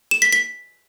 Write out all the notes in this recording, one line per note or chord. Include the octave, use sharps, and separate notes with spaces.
E7
B6
B6